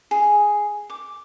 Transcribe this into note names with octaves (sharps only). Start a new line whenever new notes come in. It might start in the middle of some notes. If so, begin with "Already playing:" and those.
G#4
D6